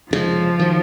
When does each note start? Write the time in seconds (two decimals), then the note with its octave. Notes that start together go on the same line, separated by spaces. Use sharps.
0.11 F1 D#2 C#3 F3 G#3
0.59 D#3 F#3